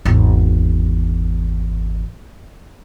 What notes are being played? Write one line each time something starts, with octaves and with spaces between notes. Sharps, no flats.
G#1 E2